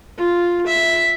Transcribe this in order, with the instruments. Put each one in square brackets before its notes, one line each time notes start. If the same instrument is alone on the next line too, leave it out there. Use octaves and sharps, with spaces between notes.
[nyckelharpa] F4
E5